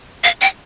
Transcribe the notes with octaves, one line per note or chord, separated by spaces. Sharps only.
F5
G5